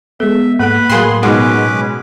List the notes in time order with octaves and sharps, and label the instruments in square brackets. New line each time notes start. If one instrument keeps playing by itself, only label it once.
[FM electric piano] G#3 B3 [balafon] A4 [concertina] E5
[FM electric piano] G#2 [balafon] A#3 A4 F#5 [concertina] B4 B5
[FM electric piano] A2 F#3 [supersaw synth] G#4 C6 [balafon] A#4 F5 G5
[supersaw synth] B2 G#3 [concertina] C#4 B4 D6 [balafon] D#4 F#4 F#5